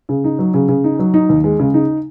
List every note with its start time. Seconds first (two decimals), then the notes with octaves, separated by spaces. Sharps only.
0.09 C#3
0.24 D#4
0.39 F#3
0.54 C#3
0.69 C#3
0.84 D#4
0.99 F#3
1.14 D#4
1.29 D#2
1.44 G#3
1.59 C#3
1.74 D#4